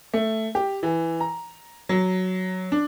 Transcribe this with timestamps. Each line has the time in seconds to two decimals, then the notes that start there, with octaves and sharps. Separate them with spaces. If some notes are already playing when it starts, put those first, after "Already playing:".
0.14 A3
0.55 G4
0.83 E3
1.20 A#5
1.89 F#3
2.72 D4